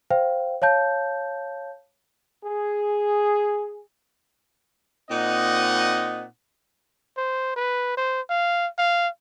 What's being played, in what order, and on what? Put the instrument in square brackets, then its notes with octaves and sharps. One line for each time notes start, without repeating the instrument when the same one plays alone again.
[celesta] C5 F5 G5
C#5 F5 A5 G6
[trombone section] G#4
[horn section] A#2 C4 D#4 D#5 F#5
[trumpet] C5
B4
C5
F5
F5